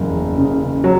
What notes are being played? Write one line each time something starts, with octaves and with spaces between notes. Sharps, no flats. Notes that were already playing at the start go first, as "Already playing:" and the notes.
Already playing: F#1 E2
C#3
F#3